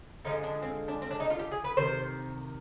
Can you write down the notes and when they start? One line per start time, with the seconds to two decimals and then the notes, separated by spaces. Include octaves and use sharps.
0.25 D3 F3 G#3 D#4
0.43 D4
0.62 C4
0.88 D4
1.02 C4
1.11 D4
1.20 D#4
1.30 F4
1.39 G4
1.52 G#4
1.64 B4
1.77 C3 D#3 C5